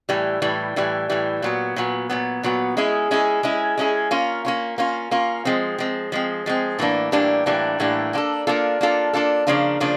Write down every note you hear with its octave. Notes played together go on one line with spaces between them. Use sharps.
A2 E3 G3
A2 E3 G3
A2 E3 G3
A2 E3 G3
A#2 F#3 B3
A#2 F#3 B3
A#2 F#3 B3
A#2 F#3 B3
G#3 C#4 E4 G#4
G#3 C#4 E4 G#4
G#3 C#4 E4 G#4
G#3 C#4 E4 G#4
A#3 C#4 F4
A#3 C#4 F4
A#3 C#4 F4
A#3 C#4 F4
F3 G#3 C4
F3 G#3 C4
F3 G#3 C4
F3 G#3 C4
A2 E3 G3 A#3 D4
A2 E3 G3 A#3 D4
A2 E3 G3 A#3 D4
A2 E3 G3 A#3 D4
A#3 D4 F4 A4
A#3 D4 F4 A4
A#3 D4 F4 A4
A#3 D4 F4 A4
C#3 F3 A#3 D4 F4
C#3 F3 A#3 D4 F4